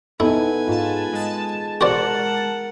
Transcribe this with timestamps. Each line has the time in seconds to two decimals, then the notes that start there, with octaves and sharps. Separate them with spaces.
0.20 B3 D#4 E4 A4 B4 G#5
0.68 G#2 F4 A5
1.13 G#3 A5
1.81 F#4 A#4 C5 D5 F#5